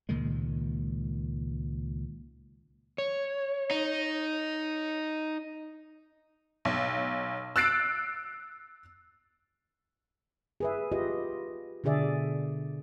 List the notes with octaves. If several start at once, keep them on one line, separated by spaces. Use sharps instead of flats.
C#2 A#2 D#3 G#3
C#5
D#4
B1
E6 F#6 A6 C7 D7
G#4 B4 E5
F4 G4 B4 D#5
B2 D3 D4 G#4 D5 E5